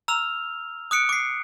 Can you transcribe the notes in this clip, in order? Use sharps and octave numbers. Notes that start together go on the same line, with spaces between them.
A#5 E6 F6 F7
D#6 F#6 C#7 D7
D6 C7